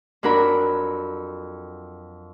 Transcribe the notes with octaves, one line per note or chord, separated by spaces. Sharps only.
F2 F#3 D4 A#4 B5